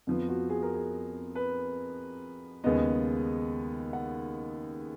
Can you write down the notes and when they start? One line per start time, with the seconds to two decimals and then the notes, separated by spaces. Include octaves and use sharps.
0.07 F2 F3 B3
0.29 F#4
0.49 G#4
0.63 A#4
0.75 G#4
1.35 B4
2.64 D#2 C#3 G#3 B3 D#5
3.93 F#5